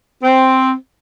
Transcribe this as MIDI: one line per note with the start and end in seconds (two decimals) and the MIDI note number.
0.22 0.73 60